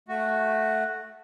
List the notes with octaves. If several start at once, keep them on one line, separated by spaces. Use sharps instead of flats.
A3 F#4